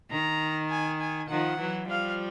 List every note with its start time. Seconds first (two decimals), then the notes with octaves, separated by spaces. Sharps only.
0.10 D#3 A#5
0.70 G#5
1.00 G#5
1.29 D#3 F3 F#5
1.59 E3 F#3
1.89 F3 G3 F5